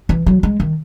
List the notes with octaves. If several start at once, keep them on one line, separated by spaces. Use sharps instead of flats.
E3
F#3
G#3
D#3